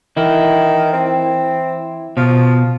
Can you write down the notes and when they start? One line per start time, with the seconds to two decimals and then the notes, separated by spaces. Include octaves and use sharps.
0.17 D#3 E3 E4
0.93 C4
2.17 B2 F3